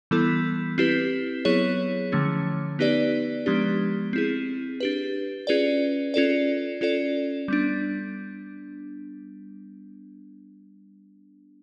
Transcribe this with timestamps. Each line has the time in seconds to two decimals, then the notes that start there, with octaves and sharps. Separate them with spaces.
0.11 E3 G3 B3 E4 A4
0.78 C4 E4 G4 B4
1.45 F#3 B3 E4 G#4 C#5
2.12 D3 F3 A3 C#4
2.79 B3 D#4 G4 B4 D5
3.46 F3 G#3 B3 D4 G4
4.13 C4 E4 G#4
4.80 D4 G4 B4
5.47 C#4 F4 G#4 B4 D5
6.14 C#4 F4 A4 D5
6.81 C#4 F4 A4 D5
7.48 G3 B3 D4